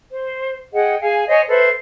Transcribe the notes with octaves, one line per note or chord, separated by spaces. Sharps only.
C5
G#4 D#5 F#5 G5
G#4 F5 G#5
C5 C#5 D#5 G#5
A4 B4 C5 E5